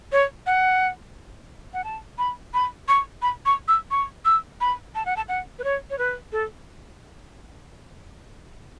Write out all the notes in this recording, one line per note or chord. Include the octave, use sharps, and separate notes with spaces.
C#5
F#5
F#5
A5
B5
B5
C#6
B5
C#6
E6
C#6
E6
B5
A5
F#5
A5
F#5
B4
C#5
C#5
B4
A4